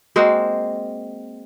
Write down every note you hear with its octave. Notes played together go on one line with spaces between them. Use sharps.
G#3 A#3 C4 F#4